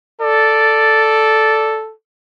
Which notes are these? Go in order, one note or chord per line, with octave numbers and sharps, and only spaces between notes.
A4 D5